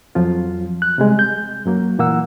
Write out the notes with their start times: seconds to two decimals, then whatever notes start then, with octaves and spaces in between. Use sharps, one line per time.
0.15 F2 F3 F#3 F4
0.82 F#6
0.98 C3 G3 G#3
1.19 G6
1.66 F#2 F#3 A#3
1.99 A#2 E3 A#3 F#5 E6